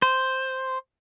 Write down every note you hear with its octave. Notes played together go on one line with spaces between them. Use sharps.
C5